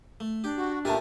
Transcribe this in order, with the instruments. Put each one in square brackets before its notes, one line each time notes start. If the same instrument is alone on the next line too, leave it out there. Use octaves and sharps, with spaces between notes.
[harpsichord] A3
[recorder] D4 [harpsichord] G4 G5
[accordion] F#4
[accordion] A#2 A3 [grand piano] G4 A5 [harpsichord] A4 A#4 G#5